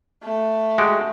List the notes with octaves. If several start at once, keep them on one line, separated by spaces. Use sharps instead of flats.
A3
G#3 F#4 G4